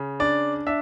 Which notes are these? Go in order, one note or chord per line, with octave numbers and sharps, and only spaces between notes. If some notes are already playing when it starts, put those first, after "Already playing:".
Already playing: C#3
D4 D5
D4 E5